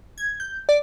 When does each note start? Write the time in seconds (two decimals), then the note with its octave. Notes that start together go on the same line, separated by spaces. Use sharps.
0.18 G#6
0.40 G6
0.69 D5